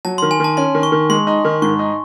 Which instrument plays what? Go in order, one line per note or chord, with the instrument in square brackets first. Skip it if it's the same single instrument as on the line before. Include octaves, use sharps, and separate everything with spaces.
[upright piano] F#3 [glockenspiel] A5
[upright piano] D#3 [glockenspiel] C6
[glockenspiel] G#5
[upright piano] D#3 [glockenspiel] A5
[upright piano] C#4 [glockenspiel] C6
[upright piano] D#3
[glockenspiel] C#6
[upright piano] D#3
[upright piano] G#3 [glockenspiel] C6
[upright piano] D#4
D#3
[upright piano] G#2 [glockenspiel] C#6
[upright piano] D#4